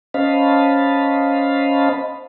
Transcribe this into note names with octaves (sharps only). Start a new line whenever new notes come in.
C#4 C5 D#5 F5 A5 B5